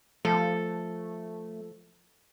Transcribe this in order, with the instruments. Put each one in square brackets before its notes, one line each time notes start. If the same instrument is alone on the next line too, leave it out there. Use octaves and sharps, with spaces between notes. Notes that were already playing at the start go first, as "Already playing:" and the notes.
[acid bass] F3 [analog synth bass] A3 [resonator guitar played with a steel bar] A4